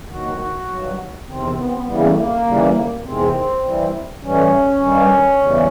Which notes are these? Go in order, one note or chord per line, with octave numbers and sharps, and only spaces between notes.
D#2 D#3 F#3 F#4
G2 D#3 F#3
E2 C3 D#3 C4
B3
C4
B3
E2 C#3 E3 G3 B3
A#3
A3
A#3
D#2 C#3 E3 G3
E2 C3 D#3 G#3 C4
G2 E3 G3
A2 E3 G3 C#4
G2 D#3 G3
E2 C#3 E3 G3